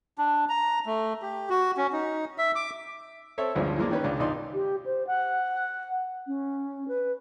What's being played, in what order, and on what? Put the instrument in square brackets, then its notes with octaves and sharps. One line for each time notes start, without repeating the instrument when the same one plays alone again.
[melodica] D4
A#5
A3
G4
F#4
C#4
D#4
E5
D6
[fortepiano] C4 A4 C#5 E5
A1 D2 G2 F3 G#3 C#4
E3 F3 G#3 A#3 D4
D#3 C#4 B4
C#2 G#3 D4
G#1 C#2 D#4 D5 C6
[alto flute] G4
C5
F#5
C#4
B4